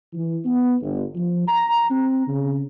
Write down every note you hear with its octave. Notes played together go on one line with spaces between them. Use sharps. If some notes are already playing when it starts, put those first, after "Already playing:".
E3
B3
G1
F3
A#5
C4
C#3